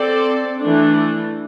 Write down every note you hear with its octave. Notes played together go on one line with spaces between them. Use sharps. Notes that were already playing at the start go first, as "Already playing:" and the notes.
Already playing: C4 A4 D5
E3 A3 D4